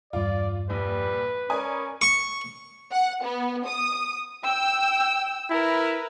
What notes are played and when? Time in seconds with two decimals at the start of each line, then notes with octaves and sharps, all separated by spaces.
0.13 E2 G2 F4 D5
0.70 A#1 G3 B4
1.50 C#4 A#4 D5 G#5 B5 D#6
2.02 C#6
2.92 F#5
3.24 B3
3.66 D#6
4.44 G5 E6
5.50 E4 A#4 B4